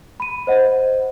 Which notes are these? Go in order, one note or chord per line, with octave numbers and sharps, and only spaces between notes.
B5 D#7
C5 D#5 F#5